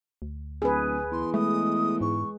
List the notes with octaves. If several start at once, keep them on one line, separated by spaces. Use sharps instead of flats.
D2
D1 G#4 B4
E2 C6
G#3 A3 D#6
G#2 C#6